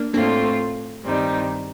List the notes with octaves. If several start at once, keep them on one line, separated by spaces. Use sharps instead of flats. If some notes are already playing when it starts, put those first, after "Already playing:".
Already playing: A#3 D4
A2 A3 A#3 C4 D4 F4
G2 D#3 G3 C4 D#4